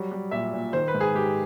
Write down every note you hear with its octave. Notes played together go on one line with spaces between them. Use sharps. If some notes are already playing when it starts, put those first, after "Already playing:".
Already playing: F#3 G3
G3
A#2 E5
A#2
D#3 C5
B4
G#2
G#4
G#2 G4